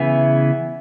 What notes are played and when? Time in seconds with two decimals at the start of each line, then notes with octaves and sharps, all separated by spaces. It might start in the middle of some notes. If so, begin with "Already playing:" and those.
Already playing: C#3 E3 B3 E5 G#5